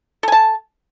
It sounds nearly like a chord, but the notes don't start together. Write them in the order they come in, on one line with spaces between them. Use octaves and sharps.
A4 G#5 A5